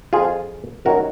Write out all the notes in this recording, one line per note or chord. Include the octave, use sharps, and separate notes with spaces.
F2 F3 F4 G#4
F#2 D#3 F#3 F#4 A#4